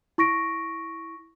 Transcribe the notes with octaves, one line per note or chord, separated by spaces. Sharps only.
E4 C#6 A#6 D7